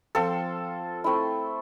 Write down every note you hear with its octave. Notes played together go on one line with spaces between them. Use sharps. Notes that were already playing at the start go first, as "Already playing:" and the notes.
F3 C4 F4 A4
A3 C4 E4